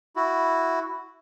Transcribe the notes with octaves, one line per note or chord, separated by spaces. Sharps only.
E4 F#4